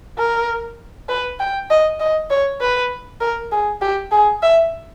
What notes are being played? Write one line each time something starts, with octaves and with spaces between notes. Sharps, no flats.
A#4
B4
G5
D#5
D#5
C#5
B4
A#4
G#4
G4
G#4
E5